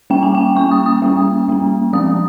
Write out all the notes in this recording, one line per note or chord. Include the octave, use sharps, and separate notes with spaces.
G3 A#3 C#4 G5
G#5
G5
G3 A#3 C#4 C#6
D#6
D#6
G3 A#3 C#4
G3 A#3 C#4
F3 G#3 C4 D#6